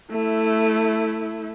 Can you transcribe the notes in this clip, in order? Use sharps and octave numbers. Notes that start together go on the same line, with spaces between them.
A3 E4